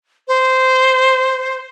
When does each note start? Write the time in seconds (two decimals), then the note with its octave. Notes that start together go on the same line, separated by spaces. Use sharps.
0.28 C5